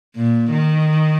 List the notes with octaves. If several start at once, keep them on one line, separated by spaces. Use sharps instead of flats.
A#2
D#3